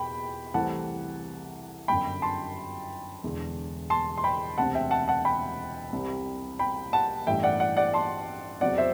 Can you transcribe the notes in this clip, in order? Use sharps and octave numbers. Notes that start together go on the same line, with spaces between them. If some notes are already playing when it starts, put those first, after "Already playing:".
Already playing: E2 B2 G5 B5
C2 C3 E3 A3 C4 F#5 A5
G1 F#2 D3 G5 B5
A5 C6
E1 E2 D3
A5 C6
C6
G5 B5
E1 D2 C3 G3 C4 F#5 A5
E5 G5
F#5 A5
F#5 A5
G5 B5
C2 C3 G3 C4
G5 B5
F#5 A5
A1 G2 E3 A3 E5 G5
D5 F#5
D5 F#5
D5 F#5
A5 C6
E2 C3 F#3 C4 D5 F#5
C5 E5